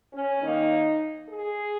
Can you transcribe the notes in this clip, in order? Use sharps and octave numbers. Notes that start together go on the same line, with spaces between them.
C#4
D#2 D#3 A#3 D#4
G#4